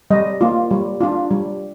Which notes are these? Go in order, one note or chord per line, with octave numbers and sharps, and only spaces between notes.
G3 D#5
A#3 F4
G3
D4 F4
G3